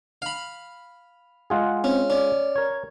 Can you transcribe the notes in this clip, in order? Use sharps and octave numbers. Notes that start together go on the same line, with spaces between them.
F5 B5
G#3 F4 G#4 F#5
C4 C#4
C#4 D5
A#4 C#5 G#6